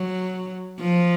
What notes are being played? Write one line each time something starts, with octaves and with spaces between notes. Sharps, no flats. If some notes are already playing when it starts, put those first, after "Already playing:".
Already playing: F#3
F3